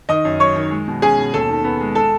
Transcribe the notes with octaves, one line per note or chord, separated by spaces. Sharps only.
D#3 D#5 D#6
F#2
F#3 C#5 C#6
D#3
G#3
B2
C#4 G#4 G#5
B2
D#2 A4 A5
D#3
B3
G#3
A4 A5